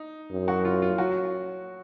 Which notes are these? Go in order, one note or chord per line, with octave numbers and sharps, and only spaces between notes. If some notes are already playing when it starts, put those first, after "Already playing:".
Already playing: D#4
F#2
F#3 F#4
F4
F4
F#3 F#4